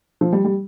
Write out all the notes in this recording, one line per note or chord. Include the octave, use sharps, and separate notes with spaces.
F3
G3
G3